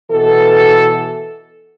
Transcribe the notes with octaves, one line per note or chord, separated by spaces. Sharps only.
B2 E3 A4